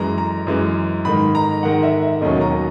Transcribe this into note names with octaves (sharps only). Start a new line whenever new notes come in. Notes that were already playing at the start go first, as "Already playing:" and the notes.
Already playing: F#2 E3 G#3 A#5
A#5
F#2 E3 G#3
G#2 D#3 G#3 B5
A#5
G#2 D#3 G#3 F#5
E5
E5
E1 D#2 D#3 F#3 C#4 D#5
A#5